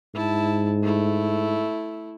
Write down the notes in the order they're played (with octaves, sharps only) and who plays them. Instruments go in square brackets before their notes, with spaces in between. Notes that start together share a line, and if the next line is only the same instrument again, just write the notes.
[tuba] G#2 [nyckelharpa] E4 A5
[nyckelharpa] A3 E4